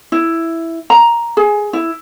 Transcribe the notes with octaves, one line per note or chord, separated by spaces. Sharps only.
E4
A#5
G#4
E4